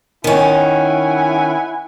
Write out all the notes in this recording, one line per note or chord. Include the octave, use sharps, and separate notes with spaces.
D#3 C#4 E4 F#5 G#5